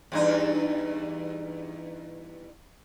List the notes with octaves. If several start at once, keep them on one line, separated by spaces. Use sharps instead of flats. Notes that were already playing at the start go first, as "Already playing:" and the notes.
E2 G2 D#4